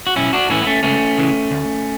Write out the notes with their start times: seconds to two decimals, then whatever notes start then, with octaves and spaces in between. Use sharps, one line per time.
0.07 F#4
0.16 B1 C#4 E4
0.33 D4 F#4
0.50 A2 E3 C#4 E4
0.62 B3
0.67 A3 C#4
0.83 C#2 A3 C#4
1.18 C#3 E3
1.51 D2